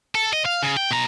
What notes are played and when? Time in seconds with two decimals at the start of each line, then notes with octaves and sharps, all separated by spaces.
0.15 A4
0.33 D#5
0.45 F5
0.62 C#3
0.77 G5
0.91 B2 A#5